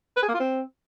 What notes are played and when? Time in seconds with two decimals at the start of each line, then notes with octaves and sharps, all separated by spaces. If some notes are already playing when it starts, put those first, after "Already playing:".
0.17 B4
0.22 G#4
0.28 A#3
0.34 F4
0.40 C4